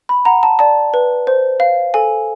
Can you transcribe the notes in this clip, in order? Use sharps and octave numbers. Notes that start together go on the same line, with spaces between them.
B5
F#5 A#5
A5
D5 A5
B4
C5
F5
A4 G#5